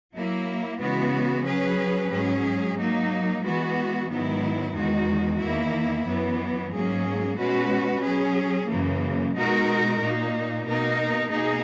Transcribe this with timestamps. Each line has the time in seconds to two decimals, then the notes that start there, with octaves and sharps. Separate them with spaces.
0.15 F#3 A#3 E4
0.80 C#3 E3 G#3 B3 F#4
1.46 F#3 C#4 G#4 B4
2.12 G#2 F#3 C#4 G#4
2.77 F#3 A#3 D#4
3.44 E3 G#3 B3 F#4
4.09 G#2 D#3 F#3 B3 E4
4.75 E2 D#3 G#3 D#4 F#4
5.41 E2 D#3 A#3 E4
6.06 F#2 E3 B3
6.72 G#2 F#3 A#3 C#4 G#4
7.38 B2 G#3 C#4 F#4 B4
8.03 F#3 C#4 G#4
8.69 F#2 C#3 E3 A#3
9.35 B2 G#3 D#4 F#4 A#4
10.00 A#2 A#3 D#4
10.66 B2 A#3 D#4 A#4
11.32 B2 A#3 D#4 G#4